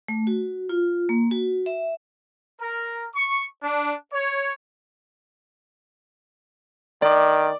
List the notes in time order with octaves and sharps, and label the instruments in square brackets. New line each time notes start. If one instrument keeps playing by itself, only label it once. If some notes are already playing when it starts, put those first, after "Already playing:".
[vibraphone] A3
F#4
F4
A#3
F#4
E5
[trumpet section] A#4
C#6
D4
C#5
[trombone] D#3 [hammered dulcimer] D5